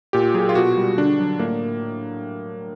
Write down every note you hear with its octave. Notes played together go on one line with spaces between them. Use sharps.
A#2 G4
F#3 G#4
F4
B2 F#4
G3
D3 D4
F#3
A2 A#3